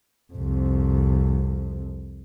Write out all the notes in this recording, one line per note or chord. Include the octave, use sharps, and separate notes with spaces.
C2 F2